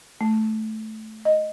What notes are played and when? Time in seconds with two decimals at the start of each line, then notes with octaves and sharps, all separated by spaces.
0.21 A3
1.25 D#5